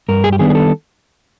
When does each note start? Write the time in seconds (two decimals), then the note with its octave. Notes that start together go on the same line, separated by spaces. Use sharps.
0.08 G2 A#4
0.24 G#4
0.33 G4
0.39 D#3 G3 B3 D4 G#4
0.50 G#4
0.55 A4